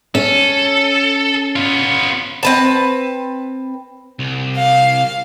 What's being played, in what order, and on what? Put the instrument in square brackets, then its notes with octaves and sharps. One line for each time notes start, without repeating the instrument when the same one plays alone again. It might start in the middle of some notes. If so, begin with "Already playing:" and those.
[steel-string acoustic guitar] C#4 [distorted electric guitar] A4
[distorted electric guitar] B3 F4
[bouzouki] C4 B4 A5
[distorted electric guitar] C2
[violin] F5